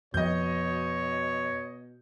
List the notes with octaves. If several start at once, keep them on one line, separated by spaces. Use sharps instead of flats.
F2 B2 F3 C#5 D#5 G6